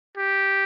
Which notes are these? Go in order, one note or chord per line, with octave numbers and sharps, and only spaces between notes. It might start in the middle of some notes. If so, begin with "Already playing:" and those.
G4